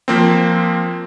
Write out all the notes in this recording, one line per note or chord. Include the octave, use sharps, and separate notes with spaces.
F3 A#3 C4